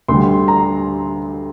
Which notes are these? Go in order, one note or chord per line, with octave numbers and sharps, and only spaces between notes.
D2 D3 G3 C6
A#5